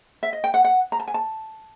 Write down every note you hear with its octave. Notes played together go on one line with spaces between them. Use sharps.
E5
D#5
G5
F#5
F#5
A#5
A5
G#5
A5